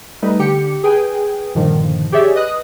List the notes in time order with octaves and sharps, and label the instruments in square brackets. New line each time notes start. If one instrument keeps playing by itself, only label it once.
[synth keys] G3 A3 D#4 B4
D3 G4 C#7
G#4 B4 G5 G#5
G2 A#2 D3 D#3 F3
G4 G#4 C#5 D5 E5
B4 D#5 D#6 F#6